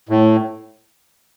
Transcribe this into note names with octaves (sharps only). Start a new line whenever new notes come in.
A2